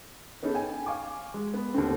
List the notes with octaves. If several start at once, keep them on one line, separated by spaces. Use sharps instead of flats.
B3 C#4 D#4 G#4 A4
G5 G#5
F5 G#5 C#6 D6
G#3
B3
D#2 D3 A3 C4